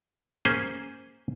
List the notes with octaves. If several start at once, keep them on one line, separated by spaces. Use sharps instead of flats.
A#3 C#4 G#4 C5